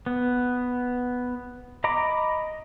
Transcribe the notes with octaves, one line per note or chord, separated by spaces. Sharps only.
B3
D#5 A#5 B5 D6